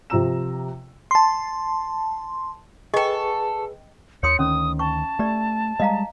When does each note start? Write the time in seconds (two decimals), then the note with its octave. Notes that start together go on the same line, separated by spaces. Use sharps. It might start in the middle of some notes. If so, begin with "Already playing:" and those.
0.10 C3 F3 F4 A#5 E6 E7
1.11 A5 C6
2.94 G#4 A4 B4 D#5 G5 C#6
4.23 D#2 C#5 C6 D#6 C#7
4.39 D2 D#3 C#4 D#6
4.79 G5 A5 C#6
5.19 A3 G4 D5
5.80 G3 G#3 D#5 F5 A#5